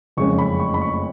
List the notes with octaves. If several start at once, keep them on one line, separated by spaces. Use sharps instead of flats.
F#1 F2 C#3 G#3 C#4 C#6
B5
C#6
B5
C#6